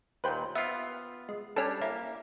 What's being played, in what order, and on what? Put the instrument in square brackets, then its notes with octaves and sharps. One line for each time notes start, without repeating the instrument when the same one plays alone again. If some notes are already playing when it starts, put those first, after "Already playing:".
[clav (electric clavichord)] D#2 A#2 [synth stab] B4 C5 G5
[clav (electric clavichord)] B3 F4 [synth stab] E5
[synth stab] G#3
[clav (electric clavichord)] G3 D4 [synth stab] C#4 A4
[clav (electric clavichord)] A#3 [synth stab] E4